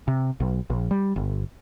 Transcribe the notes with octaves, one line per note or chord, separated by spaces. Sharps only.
C3
B1
A#1
G3
G1